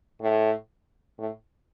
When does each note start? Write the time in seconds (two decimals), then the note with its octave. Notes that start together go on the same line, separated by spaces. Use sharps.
0.22 A2
1.19 A2